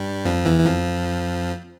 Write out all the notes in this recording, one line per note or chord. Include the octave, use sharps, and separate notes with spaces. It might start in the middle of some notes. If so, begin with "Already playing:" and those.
Already playing: G2 G3
F2 F3
E2 E3
E3
F2 F3